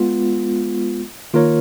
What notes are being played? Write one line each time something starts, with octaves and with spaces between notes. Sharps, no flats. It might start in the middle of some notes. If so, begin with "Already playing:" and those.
Already playing: G#3 B3 F4
D#3 A#3 F4 A#4 C#5